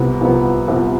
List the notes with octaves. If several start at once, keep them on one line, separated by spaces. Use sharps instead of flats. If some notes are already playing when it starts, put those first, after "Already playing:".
Already playing: C2 C3 F3 B3
C2 C3 F3 B3
C2 C3 F3 B3